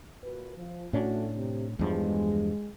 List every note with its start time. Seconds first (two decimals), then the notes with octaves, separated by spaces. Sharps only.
0.23 A#2 F#4 B4
0.55 F3
0.93 A2 A3 C#4 D4 F#4
1.35 C3
1.79 E2 G2 F3 G#3